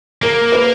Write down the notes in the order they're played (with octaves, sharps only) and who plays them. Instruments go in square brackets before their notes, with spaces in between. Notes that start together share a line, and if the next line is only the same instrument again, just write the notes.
[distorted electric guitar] A#3 [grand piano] A#4
[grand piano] B4